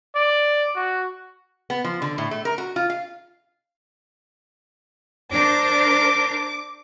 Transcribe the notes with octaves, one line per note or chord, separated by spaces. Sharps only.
D5
F#4
B3
F3
D3
A2
A3
A#4
F#4
F4
F5
D4 A#4 C5 D6